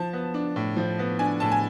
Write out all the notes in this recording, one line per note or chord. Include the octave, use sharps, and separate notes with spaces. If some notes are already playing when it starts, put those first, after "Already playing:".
Already playing: F3 A5
B3
D4
A2
F3
B3
D4 G#5
A2 A5
G#5